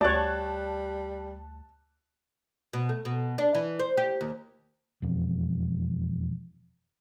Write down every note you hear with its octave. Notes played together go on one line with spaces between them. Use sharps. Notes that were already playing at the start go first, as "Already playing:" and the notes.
D2 G3 C#5 D5 A5 F#6
B2
A3
B2
D4
E3
C5
G4
D#2
E1 F2